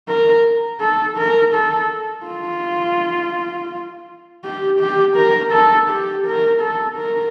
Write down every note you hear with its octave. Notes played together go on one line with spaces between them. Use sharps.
A#4
A4
A#4
A4
F4
G4
G4
A#4
A4
G4
A#4
A4
A#4